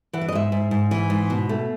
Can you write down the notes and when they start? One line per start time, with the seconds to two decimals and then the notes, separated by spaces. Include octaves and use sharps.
0.13 E3 F#5
0.21 E5
0.28 D#5
0.33 G#2 E5
0.52 G#2
0.71 G#2
0.91 E3
1.10 G#2
1.30 B2
1.49 A3